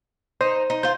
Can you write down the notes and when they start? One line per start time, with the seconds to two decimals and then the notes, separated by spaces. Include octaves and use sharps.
0.41 D#4 C5
0.70 D#4
0.83 F4 C5 G6